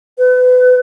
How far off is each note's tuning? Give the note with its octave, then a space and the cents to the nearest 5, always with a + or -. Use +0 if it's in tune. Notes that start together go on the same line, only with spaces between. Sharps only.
B4 +30